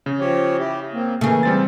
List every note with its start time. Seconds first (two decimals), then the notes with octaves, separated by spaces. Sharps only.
0.06 C#3
0.20 F3 G4 C#5
0.58 E4 G4
0.93 A#3 C4
1.21 C#3 E3 A3 A#3 G#4
1.43 G3 C4 A6